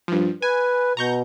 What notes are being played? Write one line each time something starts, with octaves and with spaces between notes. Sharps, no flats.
G2 F3
B4 G#5
B2 A#5 C#6 G6